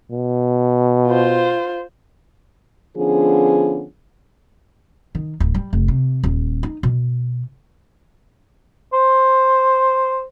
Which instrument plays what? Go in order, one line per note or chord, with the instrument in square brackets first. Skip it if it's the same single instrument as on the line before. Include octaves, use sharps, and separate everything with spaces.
[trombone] B2
[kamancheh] F4 C5
[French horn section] D3 F3 B3 C#4 G#4
[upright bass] D#3
D1
G3
F1
C3
D#1
D#4
B2
[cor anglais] C5